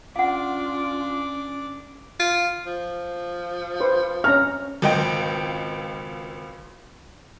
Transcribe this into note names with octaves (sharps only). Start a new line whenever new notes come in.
C#4 D4 F4 F5 F#5 D6
F4
F3
B4 C5
C#4 A#5 C#6 F6
G#1 C#2 D#5 G5